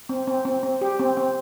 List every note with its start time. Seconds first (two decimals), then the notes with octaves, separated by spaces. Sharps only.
0.09 C4
0.27 C4
0.45 C4
0.63 C4
0.81 G4
0.99 C4
1.17 C4